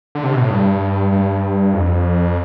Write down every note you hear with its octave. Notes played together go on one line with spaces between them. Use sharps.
D3
C3
B2
A2
G2
G2
F2